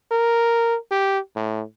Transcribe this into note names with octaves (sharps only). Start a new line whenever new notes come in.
A#4
G4
A2